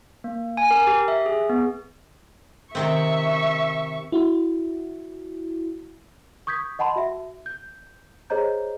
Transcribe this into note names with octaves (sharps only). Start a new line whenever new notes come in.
A#3
G#5
A#4
G4
E5
G#4
B3
C3 D#3 C4 E5 C#6
E4 F#4
C#6 D#6 G6 G#6 B6
D#5 F#5 A5 B5 C6
F#4 E5
G6
G#4 C5 C#5 D#5 A#5 G6